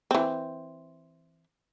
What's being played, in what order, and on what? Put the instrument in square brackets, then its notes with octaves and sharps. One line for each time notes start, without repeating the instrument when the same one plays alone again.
[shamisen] E3 C4